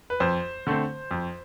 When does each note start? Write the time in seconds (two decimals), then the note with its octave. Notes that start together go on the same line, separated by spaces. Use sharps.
0.10 B4
0.20 F2 C5
0.67 D3 A3 C4
1.11 F2